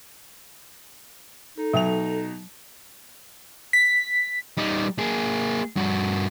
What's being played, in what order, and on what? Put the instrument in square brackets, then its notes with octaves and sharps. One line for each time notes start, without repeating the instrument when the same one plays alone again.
[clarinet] D#4 [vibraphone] A4
[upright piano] B2 G5 F7 [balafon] F#3
[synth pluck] B6
[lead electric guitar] G3 D#4
A#3 G#4
G2 F#4